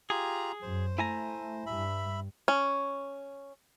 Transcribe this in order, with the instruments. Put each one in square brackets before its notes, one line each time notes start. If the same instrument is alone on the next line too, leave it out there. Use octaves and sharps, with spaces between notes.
[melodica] F4 G4 A#5 [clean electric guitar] G#4
[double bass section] F#2 [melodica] C5
[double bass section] A3 [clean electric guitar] E4 G#5 A#5
[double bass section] G2 [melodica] E5 B5
[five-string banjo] C#4